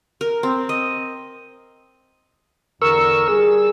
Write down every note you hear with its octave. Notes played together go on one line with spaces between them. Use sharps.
A#4
C4
D#5
E2 D3 A#4 C#6 E6
G3 G#4 E6